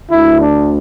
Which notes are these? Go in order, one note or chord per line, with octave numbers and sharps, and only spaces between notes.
D2 D3 E4
D4